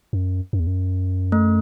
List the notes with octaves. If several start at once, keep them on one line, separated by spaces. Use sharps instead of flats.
F#2
F#2
E2
F#2
A3